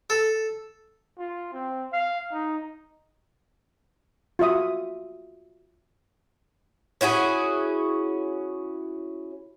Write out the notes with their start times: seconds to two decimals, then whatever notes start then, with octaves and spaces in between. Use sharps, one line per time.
0.10 A4
1.18 F4
1.53 C4
1.93 F5
2.32 D#4
4.39 F4 F#4 E5 D#6
7.01 C#4 E4 F#4 G#4